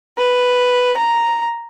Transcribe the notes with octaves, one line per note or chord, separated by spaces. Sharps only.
B4
A#5